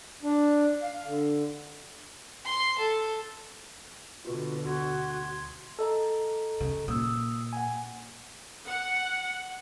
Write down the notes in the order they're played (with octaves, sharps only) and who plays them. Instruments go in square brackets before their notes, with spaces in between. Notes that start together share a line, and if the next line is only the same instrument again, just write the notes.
[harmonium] D4
F5
D3
[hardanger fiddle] C6
A4
[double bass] B2 D3 [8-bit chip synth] F4 F#4 B4
[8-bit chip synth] D2 C6 G#6 [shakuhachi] F#4
[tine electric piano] A4 D#5 A#5
[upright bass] C#3
[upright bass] A#2 [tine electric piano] D#6 E6
[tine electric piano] F#5 G#5
[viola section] F#5